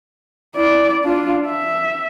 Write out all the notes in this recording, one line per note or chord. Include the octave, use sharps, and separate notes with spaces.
E4 D5
D4 F4
E5